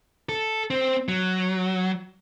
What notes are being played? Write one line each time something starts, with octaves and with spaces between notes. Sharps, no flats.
A4
C4
F#3